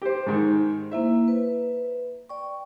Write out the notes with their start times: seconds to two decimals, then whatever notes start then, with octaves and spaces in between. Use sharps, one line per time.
0.02 G4 C5
0.26 G#2 D#3
0.92 A#3 E4 C5 E5
1.28 B4
2.29 D5 G5 C#6